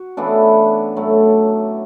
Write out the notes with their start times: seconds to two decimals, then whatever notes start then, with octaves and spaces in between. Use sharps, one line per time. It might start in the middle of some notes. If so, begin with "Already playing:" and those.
Already playing: F#4
0.17 C#3 E3 A3 B3 D4
0.96 A2 F#3 A3